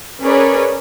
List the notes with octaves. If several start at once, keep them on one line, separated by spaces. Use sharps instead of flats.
C#4 G#4 A#4 B4 C#5 D5